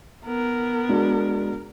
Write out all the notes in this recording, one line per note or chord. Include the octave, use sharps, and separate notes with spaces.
B3 A#4
G#3 D4 F#4